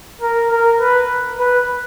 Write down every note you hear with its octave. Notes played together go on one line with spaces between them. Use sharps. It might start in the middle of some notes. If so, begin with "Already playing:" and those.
A#4
A#4
B4
B4